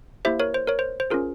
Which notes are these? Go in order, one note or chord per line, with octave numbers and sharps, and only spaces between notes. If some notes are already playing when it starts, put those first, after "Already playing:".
A#3 E4 G4 C5 E5
A#4 C#5
C5
A#4 C#5
C5
C5
C#4 F4 G#4 A#4